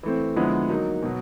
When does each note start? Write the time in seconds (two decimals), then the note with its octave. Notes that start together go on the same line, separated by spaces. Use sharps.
0.03 E3 A3 C4
0.36 D3 F3 G#3 B3 E4
0.69 F#3 A#3 D#4
1.03 B2 F#3